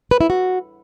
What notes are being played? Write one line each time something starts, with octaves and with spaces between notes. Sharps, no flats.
B4
E4
F#4